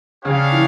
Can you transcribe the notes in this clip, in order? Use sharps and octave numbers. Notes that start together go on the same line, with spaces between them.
C#3 D4 G4 C#5 F5
E3